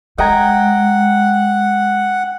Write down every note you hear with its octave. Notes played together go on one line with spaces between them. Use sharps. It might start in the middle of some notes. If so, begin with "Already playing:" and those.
G#3 D#5 F#5 G5 A#5 G#6